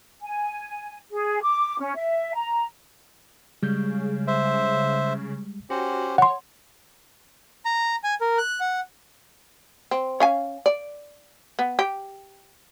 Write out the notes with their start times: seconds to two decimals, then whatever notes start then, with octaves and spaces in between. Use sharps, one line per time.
0.23 G#5
1.12 G#4
1.42 D6
1.80 C#4
1.96 E5
2.35 A#5
3.63 C#3 G3 G#3 G6
4.27 C5 E5
5.70 C#4 F#4 G4 C5
6.18 C#5 F#5 C6
7.65 A#5
8.04 G#5
8.21 A#4
8.38 F#6
8.60 F#5
9.91 C4
10.20 C#4 F5 G#5
10.66 D5
11.59 B3
11.79 G4